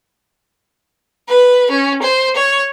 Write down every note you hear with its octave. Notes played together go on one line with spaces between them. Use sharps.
B4
C#4
C5
C#5